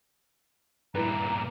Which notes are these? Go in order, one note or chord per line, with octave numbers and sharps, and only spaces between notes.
G2 A#2 E4 B4 A#5